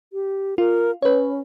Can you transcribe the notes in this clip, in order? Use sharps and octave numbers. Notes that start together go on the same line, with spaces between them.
G4
F4 A#4
C#4 B4 C#5